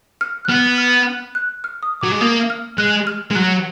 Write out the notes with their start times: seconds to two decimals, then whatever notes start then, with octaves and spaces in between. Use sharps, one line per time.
0.21 F6
0.45 F#6
0.49 B3 F6
0.78 F6
1.06 F#6
1.35 F#6
1.64 F6
1.83 D#6
2.01 F#3 D6
2.12 G#3
2.21 A#3 D#6
2.50 F6
2.78 G#3 F#6
3.07 F6
3.31 G#3
3.35 F#3 F#6